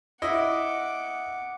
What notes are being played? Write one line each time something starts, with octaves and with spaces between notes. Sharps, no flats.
E4 D#5 F#5 D6